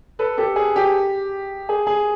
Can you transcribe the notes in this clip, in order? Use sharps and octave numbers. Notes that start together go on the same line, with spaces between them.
A4 B4
G4 A4
G#4
G4
G#4
G#4